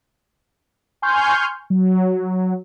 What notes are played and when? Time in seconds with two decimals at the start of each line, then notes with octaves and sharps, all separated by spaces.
1.02 G#5 C6 C#6 F6 G6
1.70 F#3